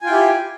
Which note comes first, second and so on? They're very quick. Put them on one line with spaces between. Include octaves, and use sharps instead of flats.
G#5 F4 G5 E4 G4